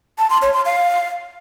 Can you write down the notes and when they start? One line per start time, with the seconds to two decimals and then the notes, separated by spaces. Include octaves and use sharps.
0.18 A5
0.30 C6
0.42 C#5
0.54 C6
0.65 F5